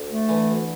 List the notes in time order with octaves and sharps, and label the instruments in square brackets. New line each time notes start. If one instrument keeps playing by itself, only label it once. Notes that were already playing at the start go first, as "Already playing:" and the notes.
Already playing: [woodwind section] D2
A3
[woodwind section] D3 [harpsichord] E3
[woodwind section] D2